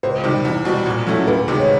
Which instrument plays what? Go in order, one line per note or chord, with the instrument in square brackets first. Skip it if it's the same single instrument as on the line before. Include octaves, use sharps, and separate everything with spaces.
[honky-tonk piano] C#2 [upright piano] C5
[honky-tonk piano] C3 D#3 G3
E2
B2 G3 C4
A#2
F#3 A3 C#4 E4
[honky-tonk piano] D2 [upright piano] B4
[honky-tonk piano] C3 D#3 G#3 B3
[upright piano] C#5